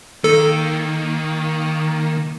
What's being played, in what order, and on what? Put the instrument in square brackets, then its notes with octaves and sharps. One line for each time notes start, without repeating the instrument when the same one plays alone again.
[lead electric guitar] D#3 [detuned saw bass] A#3 [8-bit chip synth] A4